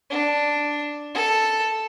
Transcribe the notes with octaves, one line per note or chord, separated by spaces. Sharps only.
D4
A4